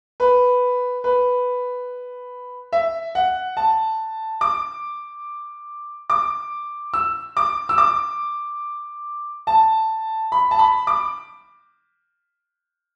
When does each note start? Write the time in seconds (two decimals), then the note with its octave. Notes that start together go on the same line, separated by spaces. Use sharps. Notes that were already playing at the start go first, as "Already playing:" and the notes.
0.20 B4
1.04 B4
2.73 E5
3.15 F#5
3.57 A5
4.41 D6
6.10 D6
6.94 E6
7.37 D6
7.69 E6
7.78 D6
9.47 A5
10.32 B5
10.51 A5
10.59 B5
10.87 D6